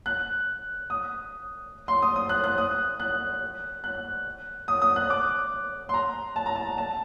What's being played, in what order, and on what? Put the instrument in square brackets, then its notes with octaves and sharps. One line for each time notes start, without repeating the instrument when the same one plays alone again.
[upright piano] F#6
D#6
C6
D#6
D#6
F#6
F#6
D#6
F#6
F#6
D#6
D#6
F#6
D6
C6
A#5
A5
A#5
A5
A5